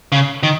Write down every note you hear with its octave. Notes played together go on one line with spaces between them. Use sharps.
C#3
D#3